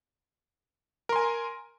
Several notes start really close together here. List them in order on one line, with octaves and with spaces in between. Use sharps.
A#4 C6 G#5